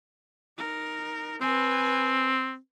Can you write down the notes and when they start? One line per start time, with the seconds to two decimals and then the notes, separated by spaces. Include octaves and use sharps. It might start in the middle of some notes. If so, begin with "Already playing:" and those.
0.58 D#4 A#4
1.41 C4 B4 G#5